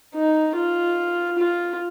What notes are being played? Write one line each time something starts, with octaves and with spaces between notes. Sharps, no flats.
D#4
F4
F4